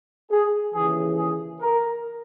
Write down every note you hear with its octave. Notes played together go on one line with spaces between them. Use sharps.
G#4
D#2 C#3 E3 G#4
G#4
A#4